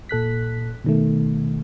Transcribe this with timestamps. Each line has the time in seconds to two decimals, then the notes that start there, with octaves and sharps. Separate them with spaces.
0.09 A#2 A4 F#6 B6
0.84 B2 D#3 A3